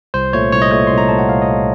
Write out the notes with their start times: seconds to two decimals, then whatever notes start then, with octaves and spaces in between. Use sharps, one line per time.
0.14 C2 C5
0.33 A#2 A3 C#5
0.52 C2 C#5
0.62 D#5
0.71 A#2 A3 C#5
0.87 C2 C6
0.98 A#5
1.09 A#2 A3 A5
1.19 F#5
1.29 C2 F5
1.42 D#5
1.48 A#2 A3